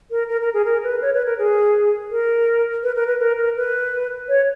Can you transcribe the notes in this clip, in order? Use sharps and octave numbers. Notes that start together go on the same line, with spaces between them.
A#4
A#4
A#4
G#4
A#4
B4
C#5
B4
A#4
G#4
A#4
B4
A#4
B4
A#4
A#4
B4
C#5